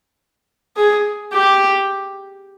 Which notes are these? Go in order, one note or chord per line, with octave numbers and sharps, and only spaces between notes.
G#4
G4